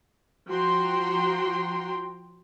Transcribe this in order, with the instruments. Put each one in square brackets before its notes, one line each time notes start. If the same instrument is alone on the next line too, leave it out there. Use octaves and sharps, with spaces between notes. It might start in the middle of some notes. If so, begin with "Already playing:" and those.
[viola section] F3 F#4 G5 A#5 C6